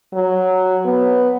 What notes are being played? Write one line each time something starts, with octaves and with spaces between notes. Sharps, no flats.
F#3
B3